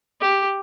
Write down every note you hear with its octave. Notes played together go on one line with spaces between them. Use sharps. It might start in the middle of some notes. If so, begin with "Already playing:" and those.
G4